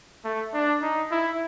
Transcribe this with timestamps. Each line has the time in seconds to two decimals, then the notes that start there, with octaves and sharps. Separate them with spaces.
0.25 A3
0.54 D4
0.82 D#4
1.11 E4